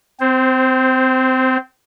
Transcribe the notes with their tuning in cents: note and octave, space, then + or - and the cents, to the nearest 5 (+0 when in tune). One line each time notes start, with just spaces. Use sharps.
C4 -20 C5 +5